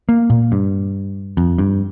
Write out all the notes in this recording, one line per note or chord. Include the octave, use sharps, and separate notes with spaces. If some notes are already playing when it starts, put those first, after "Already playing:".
A#3
A#2
G2
F2
G2